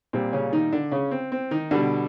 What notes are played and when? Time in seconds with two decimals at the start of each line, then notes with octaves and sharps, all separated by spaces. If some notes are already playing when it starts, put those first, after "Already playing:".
0.13 A#2 G3 C4
0.33 C#3 C#4
0.53 D#3 D#4
0.73 D3 D4
0.91 C#3 C#4
1.11 C4
1.32 C4
1.51 D#3 D#4
1.71 B2 D3 G3 D4